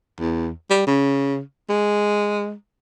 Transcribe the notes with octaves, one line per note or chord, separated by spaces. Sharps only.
E2
G3
C#3
G#3